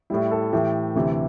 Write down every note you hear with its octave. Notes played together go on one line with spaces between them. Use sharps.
A2 G3 E4
A4
A2 E3 A3 G4
D2 C3 E3